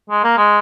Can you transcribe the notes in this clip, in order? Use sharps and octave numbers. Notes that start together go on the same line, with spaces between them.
G#3
A#3
G#3